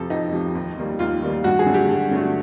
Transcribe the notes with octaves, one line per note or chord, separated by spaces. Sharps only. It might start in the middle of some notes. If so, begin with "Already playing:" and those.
Already playing: F2 C3 F3 A4
F2 D#4
C3 F3
D#2
D#3 G3 A#3
D#2 F4
D#3 G3 A#3
G2 F#4
G#4
D3 F#3 A3
G4
G2
D3 F#3 A3